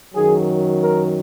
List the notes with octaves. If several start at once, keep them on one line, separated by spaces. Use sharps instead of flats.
F#2 D#3 F#3 G#4
A#4